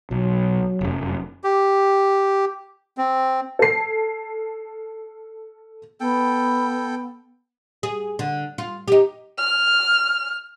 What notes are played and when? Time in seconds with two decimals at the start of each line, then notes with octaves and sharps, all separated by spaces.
0.11 B1 F#3
0.81 F1 F#2
1.44 G4
2.98 C4
3.59 A4 C7
6.00 B3 A4 G5
7.83 G#4
8.19 D3
8.58 F4
8.88 D#4 G4
9.38 F6